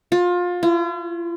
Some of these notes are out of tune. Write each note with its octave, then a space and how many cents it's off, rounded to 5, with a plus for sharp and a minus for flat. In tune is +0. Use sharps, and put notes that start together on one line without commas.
F4 +25
F4 -45